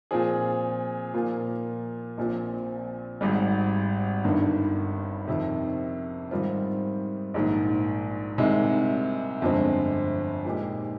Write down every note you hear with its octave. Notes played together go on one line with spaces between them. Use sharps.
A#2 F3 C4 F4 G#4
A#2 F3 A#3 F4
A#1 A#2 F3 C4
G#1 G#2 G3
G1 G2 D#3
F2 C3 D#3
G#2 D#3 G3 C4 F4
A#1 G#2 D#3
C2 C3 D#3 G#3
G1 F2 D3 G#3 C4
A#2 G#3 D#4 G4